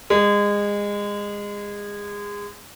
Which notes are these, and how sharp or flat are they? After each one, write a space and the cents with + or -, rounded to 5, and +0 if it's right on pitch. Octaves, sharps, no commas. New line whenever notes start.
G#3 -25